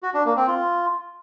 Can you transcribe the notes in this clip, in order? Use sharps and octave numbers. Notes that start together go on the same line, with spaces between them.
F#4
D4
A#3
C4
F4